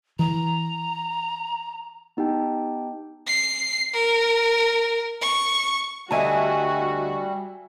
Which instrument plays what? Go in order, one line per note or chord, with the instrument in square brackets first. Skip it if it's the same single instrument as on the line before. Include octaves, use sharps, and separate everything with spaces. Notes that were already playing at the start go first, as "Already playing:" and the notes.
[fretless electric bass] E3 [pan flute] A#5
[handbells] B3 D#4 G4 G5 A5
[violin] C7
A#4
C#6
[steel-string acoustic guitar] D2 D#5 [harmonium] G3 [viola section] F#4 [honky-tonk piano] E5 G#5 A5